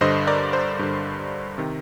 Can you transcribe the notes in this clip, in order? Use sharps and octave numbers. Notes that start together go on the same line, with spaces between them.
G2 D3 C5 D#5
A#4 D5
C5
G2 D3
C3 D#3